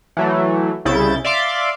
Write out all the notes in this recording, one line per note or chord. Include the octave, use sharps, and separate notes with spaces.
E3 F#3 A3
C2 C#3 E4 G6 A6
D5 E5 F5 C6 D6